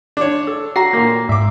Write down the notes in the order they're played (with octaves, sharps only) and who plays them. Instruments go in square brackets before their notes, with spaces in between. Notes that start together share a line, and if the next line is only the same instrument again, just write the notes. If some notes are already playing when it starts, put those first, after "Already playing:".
[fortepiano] D4 C#5
A4
[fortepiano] F#4 [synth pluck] A#5 A#6 C7
[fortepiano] A#2 A#3
[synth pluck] G#2 [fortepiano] E5 D6